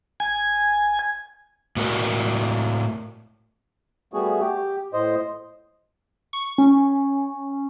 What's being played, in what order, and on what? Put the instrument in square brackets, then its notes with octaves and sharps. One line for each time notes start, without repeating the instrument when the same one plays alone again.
[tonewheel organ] G#5
[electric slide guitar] A2 F#4 A#4 D5
[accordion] G3 A3 B3 F#4 G#4
G4
A2 C5 D#5
[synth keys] C#6
C#4